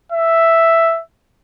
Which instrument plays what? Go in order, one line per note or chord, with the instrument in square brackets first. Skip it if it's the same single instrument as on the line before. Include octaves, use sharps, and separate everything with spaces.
[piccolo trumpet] E5